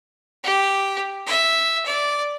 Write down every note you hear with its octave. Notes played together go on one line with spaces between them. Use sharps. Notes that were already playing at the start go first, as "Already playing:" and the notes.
G4
E5
D5